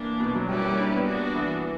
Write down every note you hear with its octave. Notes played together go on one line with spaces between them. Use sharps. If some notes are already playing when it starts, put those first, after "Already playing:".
Already playing: E3 A#3 D4
B2
F#3
G3 C#4 E4 G4 B4 D5
A#3
G3
D4
B3
B3 D4 F#4
E3